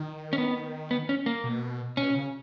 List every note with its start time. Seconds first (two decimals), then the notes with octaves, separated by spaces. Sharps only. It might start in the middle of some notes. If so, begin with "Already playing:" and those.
Already playing: D#3
0.33 C#4
0.38 B3
0.91 B3
1.09 C#4
1.26 A#3
1.44 B2
1.97 B2 C#4
2.14 C#3